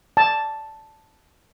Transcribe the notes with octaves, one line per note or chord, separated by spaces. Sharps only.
A5